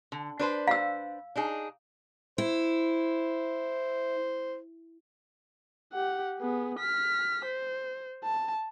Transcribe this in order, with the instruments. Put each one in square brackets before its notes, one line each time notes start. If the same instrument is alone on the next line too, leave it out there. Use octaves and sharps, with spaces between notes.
[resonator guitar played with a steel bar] D3
D4 B4 C5
[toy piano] F5 E6
[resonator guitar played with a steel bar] D4 D#4 G#4
[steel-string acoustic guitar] E4 [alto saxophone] C5
[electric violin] G4 F#5
B3 G#4
F6 B6
C5
A5